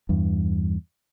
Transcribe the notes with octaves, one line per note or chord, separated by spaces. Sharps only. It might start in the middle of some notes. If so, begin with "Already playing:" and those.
E2 G2